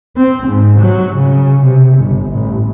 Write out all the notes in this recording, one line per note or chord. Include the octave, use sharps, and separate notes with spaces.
C4
G#2
F#3
C#3
C3
G1
A1